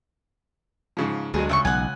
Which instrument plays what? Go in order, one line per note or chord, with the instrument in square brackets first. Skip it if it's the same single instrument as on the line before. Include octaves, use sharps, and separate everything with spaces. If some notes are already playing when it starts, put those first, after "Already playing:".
[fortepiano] G#2 C#3 F3
[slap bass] D2 [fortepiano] G2 F#3 G#3 [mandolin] G#4
[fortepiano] C#2 [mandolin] E5 G5 C#6
[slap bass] B1 [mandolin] F#5 G#5